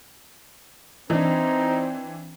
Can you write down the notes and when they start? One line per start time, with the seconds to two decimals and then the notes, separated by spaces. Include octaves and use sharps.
1.10 E3 C4 D4 D#4